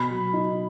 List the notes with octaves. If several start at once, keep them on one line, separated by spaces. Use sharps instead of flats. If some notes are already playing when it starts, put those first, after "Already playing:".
Already playing: B2 B5
F#3
D#4